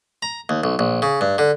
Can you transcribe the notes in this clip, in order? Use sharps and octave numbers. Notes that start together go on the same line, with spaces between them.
A#5
D#2
B1
A#1
C#3
G2
D3